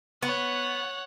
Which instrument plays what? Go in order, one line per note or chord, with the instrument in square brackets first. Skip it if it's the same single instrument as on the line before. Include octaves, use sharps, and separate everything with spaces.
[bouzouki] B3 [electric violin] C#5 F#5